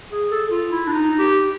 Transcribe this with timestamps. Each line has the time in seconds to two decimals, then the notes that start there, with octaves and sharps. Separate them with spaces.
0.12 G#4
0.31 A4
0.51 F4
0.72 E4
0.87 D4
0.92 D#4
1.19 G4